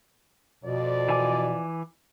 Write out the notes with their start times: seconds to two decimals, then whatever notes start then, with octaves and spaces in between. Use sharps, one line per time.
0.64 F2 B2 F3 D5
1.09 E3 G#5 D6